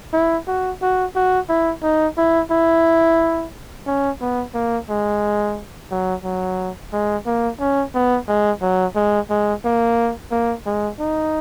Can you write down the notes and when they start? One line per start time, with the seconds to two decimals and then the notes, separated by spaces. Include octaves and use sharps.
0.14 E4
0.48 F#4
0.82 F#4
1.16 F#4
1.49 E4
1.83 D#4
2.18 E4
2.51 E4
3.87 C#4
4.21 B3
4.54 A#3
4.90 G#3
5.91 F#3
6.24 F#3
6.93 G#3
7.26 A#3
7.60 C#4
7.95 B3
8.28 G#3
8.62 F#3
8.96 G#3
9.30 G#3
9.65 A#3
10.31 A#3
10.66 G#3
10.99 D#4